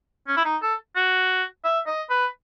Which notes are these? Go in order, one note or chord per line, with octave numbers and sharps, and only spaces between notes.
C#4
E4
D#4
A4
F#4
E5
D#5
B4